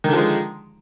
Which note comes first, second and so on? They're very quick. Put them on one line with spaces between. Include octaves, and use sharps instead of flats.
D#3 D3 F3 G#3